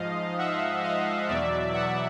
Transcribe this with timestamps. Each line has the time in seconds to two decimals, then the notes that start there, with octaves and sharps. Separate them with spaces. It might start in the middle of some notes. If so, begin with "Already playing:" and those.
Already playing: G#2 F3 D#5 F5
0.38 E5 F#5
0.83 D#5 F5
1.28 E2 B2 F#3 D5 E5
1.74 E5 F#5